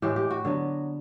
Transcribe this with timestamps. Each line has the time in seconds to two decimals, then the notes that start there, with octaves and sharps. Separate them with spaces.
0.02 A2 E3 G#3 G4
0.16 G4
0.30 F#4
0.45 D3 F#3 B3